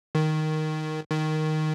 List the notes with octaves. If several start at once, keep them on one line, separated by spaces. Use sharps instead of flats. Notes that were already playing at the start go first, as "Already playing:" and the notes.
D#3
D#3